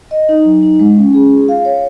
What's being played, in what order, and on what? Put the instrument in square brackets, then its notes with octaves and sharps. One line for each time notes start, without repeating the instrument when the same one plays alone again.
[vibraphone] D#5
D#4
F#3
D#4
G#3
C#4
G#4
F4
F5
C#5